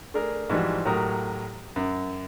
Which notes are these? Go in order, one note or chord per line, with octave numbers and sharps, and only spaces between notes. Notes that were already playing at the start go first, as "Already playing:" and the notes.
A3 D4 G#4 A#4
G#2 E3 F3 G3 F#4
A2 F#3 G4 A#4 D#6
F#2